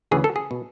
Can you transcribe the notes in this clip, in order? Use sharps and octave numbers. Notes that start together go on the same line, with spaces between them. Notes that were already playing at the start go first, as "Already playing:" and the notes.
D2 C#3 E3 G#4
A4
G#4
B2